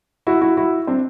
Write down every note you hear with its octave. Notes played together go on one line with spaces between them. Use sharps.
E4 F#4
E4 F#4
E4 F#4
C4 D4